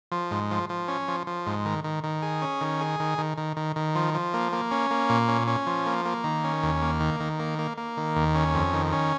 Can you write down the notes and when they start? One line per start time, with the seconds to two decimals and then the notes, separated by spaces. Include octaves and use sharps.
0.12 F3
0.31 G#2
0.51 F3
0.69 F3
0.88 C#4
1.08 F3
1.27 F3
1.46 G#2
1.65 D#3
1.84 D#3
2.04 D#3
2.23 G#4
2.42 C#4
2.61 D#3
2.81 G#4
3.00 D#3
3.18 D#3
3.38 D#3
3.57 D#3
3.76 D#3
3.95 F3
4.14 F3
4.34 A#3
4.52 A#3
4.71 C#4
4.90 A#3
5.09 A#2
5.28 C#4
5.47 C#4
5.67 F3
5.86 A#3
6.05 A#3
6.24 D#3
6.44 C#4
6.63 D#2
6.82 A#3
7.00 D#3
7.20 D#3
7.39 A#3
7.59 A#3
7.78 A#3
7.97 D#3
8.16 D#2
8.35 C#4
8.54 F2
8.74 D#3
8.93 C#4